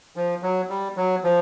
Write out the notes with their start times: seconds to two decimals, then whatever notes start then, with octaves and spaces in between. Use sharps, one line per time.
0.16 F3
0.43 F#3
0.69 G3
0.97 F#3
1.24 F3